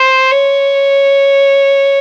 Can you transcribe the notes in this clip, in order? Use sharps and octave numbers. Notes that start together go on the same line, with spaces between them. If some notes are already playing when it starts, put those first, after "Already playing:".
Already playing: C5
C#5